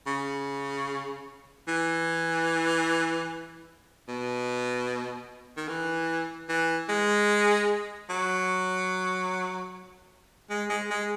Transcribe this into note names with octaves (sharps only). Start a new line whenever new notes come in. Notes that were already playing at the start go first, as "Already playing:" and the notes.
C#3
E3
B2
D#3
E3
E3
G#3
F#3
G#3
G#3
G#3